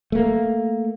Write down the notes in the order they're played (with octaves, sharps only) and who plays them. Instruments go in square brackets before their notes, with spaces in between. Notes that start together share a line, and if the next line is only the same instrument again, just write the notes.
[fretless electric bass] A3 A#3